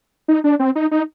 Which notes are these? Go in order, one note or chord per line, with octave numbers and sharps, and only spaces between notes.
D#4
D4
C4
D#4
D#4